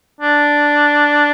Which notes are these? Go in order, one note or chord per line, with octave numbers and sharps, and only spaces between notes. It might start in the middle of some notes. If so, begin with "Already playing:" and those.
D4